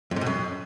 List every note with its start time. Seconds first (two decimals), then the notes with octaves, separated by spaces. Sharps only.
0.11 F2
0.16 G#2
0.21 B2
0.26 F#2